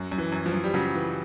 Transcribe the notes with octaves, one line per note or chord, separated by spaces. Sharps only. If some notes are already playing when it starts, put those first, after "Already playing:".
Already playing: F#2
F#2
E3
F#2
F3
F#2
G3
C#3 F#3
E3